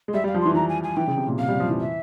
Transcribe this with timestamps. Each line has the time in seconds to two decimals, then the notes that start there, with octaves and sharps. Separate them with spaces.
0.08 G#3
0.14 G3 E5
0.24 G3
0.28 F5
0.34 F3
0.41 E3 C6
0.55 E3 A#5
0.69 G#5
0.83 G#5
0.97 E3 G5
1.07 C#3
1.18 C3
1.28 A#2
1.38 C3 F5
1.48 G3
1.60 F3
1.69 E3
1.80 E5